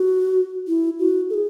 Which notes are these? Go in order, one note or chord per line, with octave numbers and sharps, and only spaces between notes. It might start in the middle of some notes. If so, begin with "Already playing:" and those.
Already playing: F#4
E4
F#4
A4
G#4